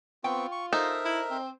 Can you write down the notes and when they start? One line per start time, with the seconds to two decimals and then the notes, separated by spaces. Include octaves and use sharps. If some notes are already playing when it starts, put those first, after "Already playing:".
0.24 B3 C4 F4 G5 C#6
0.52 C#6
0.73 D#4 A4 A#4 C5 E5
1.05 E4
1.30 C4